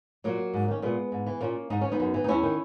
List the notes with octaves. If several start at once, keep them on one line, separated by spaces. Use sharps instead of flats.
A#2 F#3 A#3
G#2
D#3 C#4
A#2 G#3 B3
G#2
E3
A#2 A#3 C#4
G#2 D#4
E3 C#4
B3 D#4
F#2
E3
D#4
E2 C#4 E4
D#3